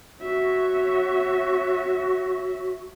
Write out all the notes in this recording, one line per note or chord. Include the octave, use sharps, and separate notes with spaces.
F#4 C#5 E5